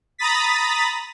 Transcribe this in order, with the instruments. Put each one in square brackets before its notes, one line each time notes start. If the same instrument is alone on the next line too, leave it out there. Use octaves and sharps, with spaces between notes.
[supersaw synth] A#5 B5 D#6 A6 B6